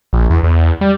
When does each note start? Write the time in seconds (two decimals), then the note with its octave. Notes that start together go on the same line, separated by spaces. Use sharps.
0.13 A#1
0.30 E2
0.43 E2
0.81 G3